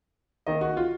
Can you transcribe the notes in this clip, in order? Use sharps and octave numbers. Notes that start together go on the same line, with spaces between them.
D#3 A#3 D#5
F#4
F4